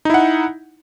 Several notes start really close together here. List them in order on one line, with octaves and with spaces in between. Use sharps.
D#4 E4 F#5